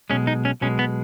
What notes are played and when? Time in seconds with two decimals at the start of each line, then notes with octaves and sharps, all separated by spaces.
0.10 B1 B2 G#3 C#4
0.27 D#4
0.45 C#4
0.61 B1 B2 G#3 C#4
0.79 B3